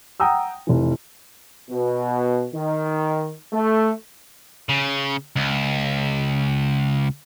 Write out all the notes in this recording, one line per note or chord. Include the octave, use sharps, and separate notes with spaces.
F#5 G5 A#5 D#6 E6
F1 E3
B2
D#3
A3
C#3
C#2